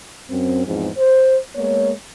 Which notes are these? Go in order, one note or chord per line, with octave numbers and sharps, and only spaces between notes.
F#2 C4
E2 G#2 F3 C4
C5
G#3 A#3 B3 C#5